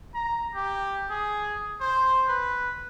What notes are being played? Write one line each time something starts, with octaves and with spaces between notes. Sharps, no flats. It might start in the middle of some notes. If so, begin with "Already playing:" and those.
A#5
G4
G#4
C5
B4